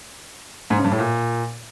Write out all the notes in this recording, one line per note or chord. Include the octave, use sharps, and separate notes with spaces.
G#2
C#3
G2
A2
A#2